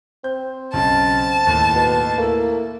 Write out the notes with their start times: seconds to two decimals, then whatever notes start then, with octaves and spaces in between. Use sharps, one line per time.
0.24 C4 G6
0.73 B1 C#3 A5
1.47 D#2 A2
1.75 B2
2.18 A3 A#3 E4